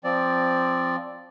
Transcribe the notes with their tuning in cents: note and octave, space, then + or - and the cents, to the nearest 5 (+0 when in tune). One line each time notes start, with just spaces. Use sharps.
F3 +0 C4 +0 D5 +0